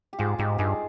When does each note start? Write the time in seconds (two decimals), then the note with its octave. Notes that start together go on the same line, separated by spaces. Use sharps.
0.13 G4
0.19 G#2 F4 G#4
0.39 G#2 D#4 G4
0.58 G2 F4 G#4